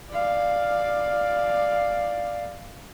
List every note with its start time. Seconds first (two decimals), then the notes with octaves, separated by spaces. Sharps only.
0.10 D5 F5